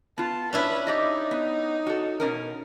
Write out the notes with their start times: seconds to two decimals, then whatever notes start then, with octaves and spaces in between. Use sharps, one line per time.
0.18 B3 F4 A5
0.53 C#4 D4 E4 B4
0.87 D#4 G4 D5 D#5
1.31 B3
1.87 F#4 A4
2.20 B2 C#4 A#4